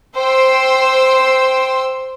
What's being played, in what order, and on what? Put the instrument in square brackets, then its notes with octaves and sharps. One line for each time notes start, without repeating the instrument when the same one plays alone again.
[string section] C5 G5 C6 E6